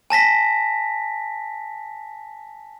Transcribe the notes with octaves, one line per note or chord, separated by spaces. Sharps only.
G#5 A5 A#6 B6